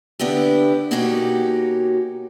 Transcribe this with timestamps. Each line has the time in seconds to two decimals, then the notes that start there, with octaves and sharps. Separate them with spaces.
0.19 D3 B3 D4 E4 G4
0.91 B2 A#3 C#4 D#4 F#4 G4